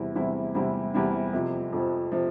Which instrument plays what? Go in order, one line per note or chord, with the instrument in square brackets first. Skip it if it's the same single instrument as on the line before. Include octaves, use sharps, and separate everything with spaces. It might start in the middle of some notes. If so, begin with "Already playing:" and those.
Already playing: [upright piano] E2 C3 G3 C4 E4
E2 C3 G3 C4 E4
E2 C3 G3 C4 E4
E2 C3 G3 C4 E4
F2 C3 F3
F2 C3 F3
C3 F3